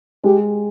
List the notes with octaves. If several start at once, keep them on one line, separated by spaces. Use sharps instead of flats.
G#3 G4